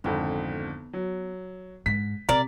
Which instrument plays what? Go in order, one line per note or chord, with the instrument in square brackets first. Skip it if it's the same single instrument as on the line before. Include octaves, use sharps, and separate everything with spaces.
[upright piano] G#1 F2 D3 [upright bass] B3
[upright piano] F#3
[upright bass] G#2 [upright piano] B6
[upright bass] C3 [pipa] A#4 D5